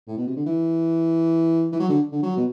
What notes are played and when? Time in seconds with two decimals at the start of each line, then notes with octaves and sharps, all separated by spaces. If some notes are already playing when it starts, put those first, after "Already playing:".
0.08 A2
0.17 B2
0.27 C3
0.36 D3
0.46 E3
1.72 E3
1.79 F#3
1.89 D3
2.12 D3
2.23 F#3
2.37 B2